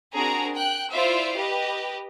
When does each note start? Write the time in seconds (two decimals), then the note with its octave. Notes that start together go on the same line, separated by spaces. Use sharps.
0.12 C4 D4 F#4 G#4 A#4 A#5
0.55 G5 F#6
0.91 E4 F4 C5 D5 E5 F5
1.35 G4 B4 D#5